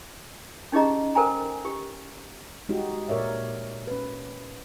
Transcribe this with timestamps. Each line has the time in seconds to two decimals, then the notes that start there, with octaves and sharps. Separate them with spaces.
0.72 C#4 D#4 G4 G#4 D#5 A#5
1.15 A4 A#4 C5 G5 G#5 A#5
1.65 G4
2.69 G#3 D#4 F#4 G4
3.09 A#2 A#4 C#5 D5 E5
3.87 C#4 B4